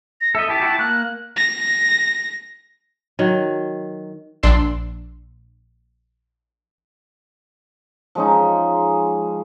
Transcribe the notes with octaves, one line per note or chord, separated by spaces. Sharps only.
A#6
A4 D#5 E5
E4 G4 A5
E4 F#4 G4
A#3 F#6
A#6
D#3 F#3
A#1 D4 C6 E6
F3 G#3 C#4 D#4